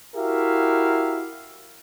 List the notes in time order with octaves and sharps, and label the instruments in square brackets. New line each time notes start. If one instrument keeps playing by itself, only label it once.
[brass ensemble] E4 F#4 G4 A#4 E5 F5